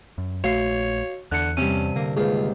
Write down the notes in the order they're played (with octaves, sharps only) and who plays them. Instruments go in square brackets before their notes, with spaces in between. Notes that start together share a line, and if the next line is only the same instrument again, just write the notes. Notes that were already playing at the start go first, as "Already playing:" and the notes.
[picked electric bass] F#2
[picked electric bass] A#1 A3 [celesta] F#4 F5 C7 [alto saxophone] C#5
[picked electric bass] E2 [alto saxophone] D3 [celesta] F#6 C#7
[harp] G2 C3 [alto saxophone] C#4 [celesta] D#7
[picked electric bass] D3 [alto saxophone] A#3
[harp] D#2 G#2 [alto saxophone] F4 [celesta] G#4 B4